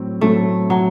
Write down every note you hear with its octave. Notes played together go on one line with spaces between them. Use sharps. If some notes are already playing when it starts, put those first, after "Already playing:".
Already playing: A2 F#3 C4
A2 F#3 A3 C4
F#3